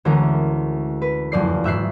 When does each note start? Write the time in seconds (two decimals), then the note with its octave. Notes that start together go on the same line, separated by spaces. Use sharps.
0.05 D2 E3 G#3 C#4 A#4
1.02 B4
1.32 F#1 F2 D5 C7
1.64 G#1 E5 F#6 C7